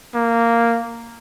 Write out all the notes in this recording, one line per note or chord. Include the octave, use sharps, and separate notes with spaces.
A#3